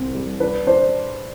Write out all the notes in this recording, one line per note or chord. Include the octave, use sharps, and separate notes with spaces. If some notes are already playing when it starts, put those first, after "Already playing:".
Already playing: C2 C4
G3
D4 B4
D4 C5